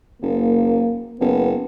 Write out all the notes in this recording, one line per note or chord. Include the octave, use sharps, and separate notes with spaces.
F#1 A#3
F#1 B3